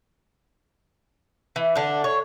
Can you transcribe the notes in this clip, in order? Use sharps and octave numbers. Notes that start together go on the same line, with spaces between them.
E3
D3 D4
C#5